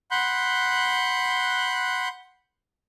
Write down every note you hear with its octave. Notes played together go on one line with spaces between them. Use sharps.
F#5 B5 C6 F#6 G6